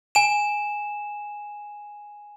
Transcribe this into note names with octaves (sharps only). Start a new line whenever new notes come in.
G#5 E7